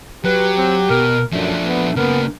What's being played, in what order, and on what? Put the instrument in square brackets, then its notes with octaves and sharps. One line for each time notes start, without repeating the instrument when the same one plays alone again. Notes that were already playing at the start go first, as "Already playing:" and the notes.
[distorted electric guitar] F#3 [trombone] G4 [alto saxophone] B4
[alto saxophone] C4
[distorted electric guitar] B2 [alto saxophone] A#4
[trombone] F#2 [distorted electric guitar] F3 D4 [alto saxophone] A3
[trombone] B3
[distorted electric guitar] C#3 A#3 [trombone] B3 [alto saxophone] A#4